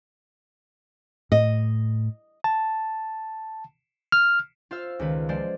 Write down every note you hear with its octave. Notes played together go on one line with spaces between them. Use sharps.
A2 D#5
A5
F6
F4 C5 F5 E6 F6
C#2 D#3 B4
F3 G#3 C5 D5